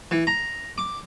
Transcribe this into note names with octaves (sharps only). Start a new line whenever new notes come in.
E3
A#5
D6